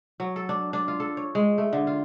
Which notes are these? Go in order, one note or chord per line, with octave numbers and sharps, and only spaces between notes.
F#3
A4
D4
D4
F4
A4
C#5
G#3
A3
D3
F4